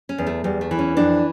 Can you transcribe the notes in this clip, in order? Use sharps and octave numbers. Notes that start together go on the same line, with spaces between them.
C#4
E2
A3
E2 G3
A3
E3
C#4
F2 D4